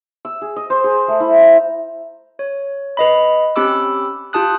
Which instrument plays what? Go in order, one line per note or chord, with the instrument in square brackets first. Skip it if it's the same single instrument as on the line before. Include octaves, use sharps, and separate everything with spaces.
[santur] E6
G#4
D#5
C5
G#4
A3
E4
A#5
[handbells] C#5
B4 D#5 B5
C4 C#4 G4 B5 D6 E6
F4 G4 A5 D#6 F#6